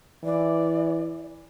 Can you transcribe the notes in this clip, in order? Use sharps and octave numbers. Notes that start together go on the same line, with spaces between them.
E3 D5